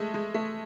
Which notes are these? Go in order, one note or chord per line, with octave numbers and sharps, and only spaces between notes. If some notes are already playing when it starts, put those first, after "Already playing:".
Already playing: G#3 A3
G#3
A3